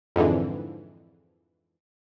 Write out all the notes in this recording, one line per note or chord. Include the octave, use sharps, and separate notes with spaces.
F2 G#2 D3 E3